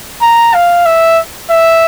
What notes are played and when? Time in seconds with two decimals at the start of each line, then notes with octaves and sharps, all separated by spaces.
0.21 A#5
0.54 F5
0.86 E5
1.51 E5